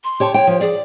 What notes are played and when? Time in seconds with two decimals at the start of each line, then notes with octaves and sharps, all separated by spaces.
0.04 C6
0.20 G4 C#5 A5
0.34 C#5 G5
0.47 F3
0.61 G#4 D5